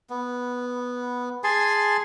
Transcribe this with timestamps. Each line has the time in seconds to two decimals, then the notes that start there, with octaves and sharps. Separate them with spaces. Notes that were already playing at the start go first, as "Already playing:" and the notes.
0.10 B3
1.44 G#4 G#5 A5 C6